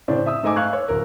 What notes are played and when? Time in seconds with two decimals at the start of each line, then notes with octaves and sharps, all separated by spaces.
0.08 A2 C#3 C4 D4
0.26 E5 D#6 E6
0.43 G#2 A3 D#5 G#5 D6
0.56 F5 C#6 F#6 G#6
0.73 C#5
0.88 D1 A#4